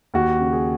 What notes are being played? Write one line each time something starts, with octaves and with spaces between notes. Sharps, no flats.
D#2 F#4
C#3
G#4